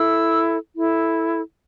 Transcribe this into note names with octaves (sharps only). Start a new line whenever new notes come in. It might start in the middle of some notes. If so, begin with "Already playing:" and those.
Already playing: E4 A4 E6
E4 A4